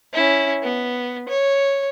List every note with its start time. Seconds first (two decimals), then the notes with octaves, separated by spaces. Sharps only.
0.13 C#4 E4
0.62 B3
1.28 C#5